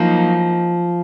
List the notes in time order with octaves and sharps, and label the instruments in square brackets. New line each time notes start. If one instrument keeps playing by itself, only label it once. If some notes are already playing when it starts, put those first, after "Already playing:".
Already playing: [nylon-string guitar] F3 [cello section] F#3 A#3 D#4